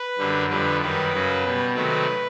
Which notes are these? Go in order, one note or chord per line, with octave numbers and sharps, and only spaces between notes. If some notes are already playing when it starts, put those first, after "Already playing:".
Already playing: B4
F#2 D3 G3
F2 D3 G3 B4
F#2 D#3 G3 B4
F#2 C#3 F#3
B2 G3
C3 D#3 F#3 A3 B4